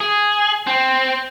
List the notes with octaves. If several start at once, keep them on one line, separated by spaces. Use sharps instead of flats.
G#4
C4